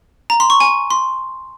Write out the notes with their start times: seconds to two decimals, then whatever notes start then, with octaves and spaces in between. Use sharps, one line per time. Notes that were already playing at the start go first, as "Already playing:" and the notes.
0.30 A#5
0.40 C6
0.50 C#6
0.60 G#5
0.91 C6